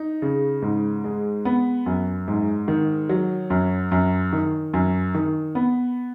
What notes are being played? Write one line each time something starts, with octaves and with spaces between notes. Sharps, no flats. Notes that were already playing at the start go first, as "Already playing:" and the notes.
Already playing: D#4
C#3
G#2
G#3
B3
F#2
G#2
D#3
F#3
F#2
F#2
D#3
F#2
D#3
B3